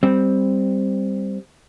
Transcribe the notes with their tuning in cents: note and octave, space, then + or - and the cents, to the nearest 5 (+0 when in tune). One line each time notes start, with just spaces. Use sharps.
G3 +10 C4 +0